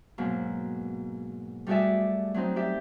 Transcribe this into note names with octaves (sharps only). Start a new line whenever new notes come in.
G#2 B2 F#3 A#3
G3 A3 F#4 G#4 D5 E5
F#3 A3 C4 D#4
G4 D5 E5 G5